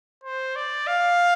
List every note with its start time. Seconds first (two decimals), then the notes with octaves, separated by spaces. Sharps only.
0.24 C5
0.56 D5
0.87 F5